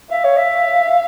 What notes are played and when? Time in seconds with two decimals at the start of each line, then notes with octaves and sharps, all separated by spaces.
0.11 E5 F5
0.24 C#5
0.37 E5
0.89 E5